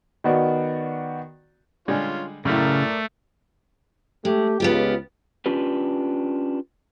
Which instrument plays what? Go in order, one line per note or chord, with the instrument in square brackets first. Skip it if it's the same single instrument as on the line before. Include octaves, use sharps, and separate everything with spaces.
[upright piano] D#3 B3 F#4 D5
[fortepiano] D3 G3 G#3 [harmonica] C#4 F4
[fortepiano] F#2 A2 [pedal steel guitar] C#3 F5 [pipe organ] A3 [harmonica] A#4 D5
[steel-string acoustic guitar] G#3 [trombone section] A3 G4
[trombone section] C#2 [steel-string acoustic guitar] B3 F4 G4
[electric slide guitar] C#4 D4 F4 G4 B4